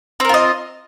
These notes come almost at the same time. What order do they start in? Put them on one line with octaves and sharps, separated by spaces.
C4 A#4 F4 D#5